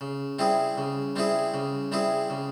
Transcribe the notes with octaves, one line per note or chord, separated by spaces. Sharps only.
C#3
G3 C4 E4 G#4
C#3
G3 C4 E4 G#4
C#3
G3 C4 E4 G#4
C#3